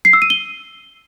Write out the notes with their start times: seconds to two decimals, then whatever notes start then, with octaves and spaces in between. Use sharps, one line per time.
0.05 C7
0.13 E6
0.22 D#7
0.30 G7